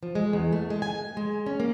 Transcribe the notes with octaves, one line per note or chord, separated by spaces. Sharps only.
F3
G#3
E2
A3
G#3
G#5
G#3
C#4
A#3